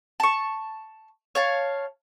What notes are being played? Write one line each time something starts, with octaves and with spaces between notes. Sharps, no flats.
A5 C#6
C#5 F5 A5